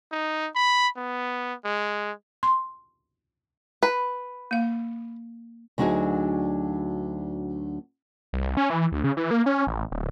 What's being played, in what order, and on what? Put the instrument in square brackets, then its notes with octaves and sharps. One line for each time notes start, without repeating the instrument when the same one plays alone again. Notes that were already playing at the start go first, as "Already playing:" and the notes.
[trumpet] D#4
B5
B3
G#3
[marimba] C6
[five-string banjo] B4
[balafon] A#3 F5
[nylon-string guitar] D2 F#3 D4 D#4 F#4 G#4
[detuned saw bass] C2
C#4
E3
D2
C#3
E3
A#3
C#4
A1
D1